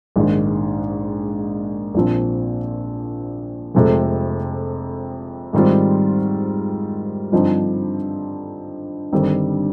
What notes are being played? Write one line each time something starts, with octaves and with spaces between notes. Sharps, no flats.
A#1 G#2 D#3
A#1 A#2 F3 C4
F1 F2 C3 F3 G#3
G#2 D#3 G3 C4 F4
G2 D3 F3 C4 D#4
G1 G2 D#3 G3 C4